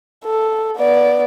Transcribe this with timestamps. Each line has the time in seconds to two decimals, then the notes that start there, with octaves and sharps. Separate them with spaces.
0.25 A4
0.78 B3 D5